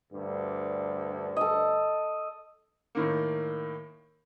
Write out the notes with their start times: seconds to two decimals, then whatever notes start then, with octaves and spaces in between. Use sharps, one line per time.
0.11 D2 G2
1.36 A4 D#5
2.95 A2 D#3 A#3